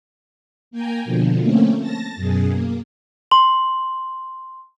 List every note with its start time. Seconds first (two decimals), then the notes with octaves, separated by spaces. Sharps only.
0.71 A#3 G5 G#5 A#5
1.05 B2 D3 F3
1.40 A3 A#3 C4 C#4
1.79 A5 A6 A#6
2.16 F#2 B2 G#4
2.49 A#3
3.31 C6 F#7